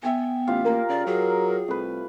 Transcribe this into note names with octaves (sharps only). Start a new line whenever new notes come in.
B3 E5 G5 G#5
A1 F4 G4 F5
A#3 A#4
C#3 D5
F#3 G#4
C2 A3 B4